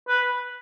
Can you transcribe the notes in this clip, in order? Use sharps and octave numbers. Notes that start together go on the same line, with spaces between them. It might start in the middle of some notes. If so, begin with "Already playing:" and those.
B4